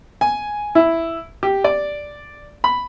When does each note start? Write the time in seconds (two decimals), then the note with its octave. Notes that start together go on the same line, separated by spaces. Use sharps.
0.21 G#5
0.75 E4
1.43 G4
1.64 D5
2.64 B5